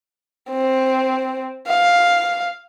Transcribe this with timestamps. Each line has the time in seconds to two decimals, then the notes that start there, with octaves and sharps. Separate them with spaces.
0.50 C4
1.67 F5